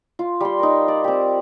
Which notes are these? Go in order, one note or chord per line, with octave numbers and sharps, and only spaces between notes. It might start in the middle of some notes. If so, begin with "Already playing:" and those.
F4
G3 C6
D#4 A#4
D5
C4 G4